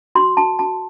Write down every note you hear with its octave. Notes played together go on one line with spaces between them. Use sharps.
F#4 C6
F#4 A5
F#4 A5